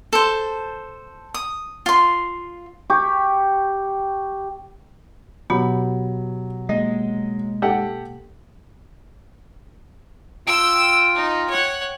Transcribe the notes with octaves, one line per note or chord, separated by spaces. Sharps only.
A4 C5
D#6
F4 C6
G4 C#6
B2 F#3 B3 G4 B5
G#3 A#3 D#5
G4 A4 F#5
F4 G5 E6
D#4
C#5 F#5